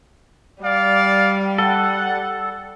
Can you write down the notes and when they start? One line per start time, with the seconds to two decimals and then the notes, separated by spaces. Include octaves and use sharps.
0.63 G3 D5 F5
1.58 A4 F#5